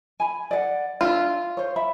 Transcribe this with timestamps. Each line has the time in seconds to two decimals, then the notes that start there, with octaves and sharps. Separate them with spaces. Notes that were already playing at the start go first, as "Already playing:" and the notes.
0.20 G#5 B5
0.51 D5 F#5
1.01 D4 F4 E5
1.57 C5 C#5
1.76 E5 B5